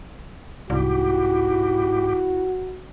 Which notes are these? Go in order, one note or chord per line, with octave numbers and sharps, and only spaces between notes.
C2 G#2 E4 F#4 G4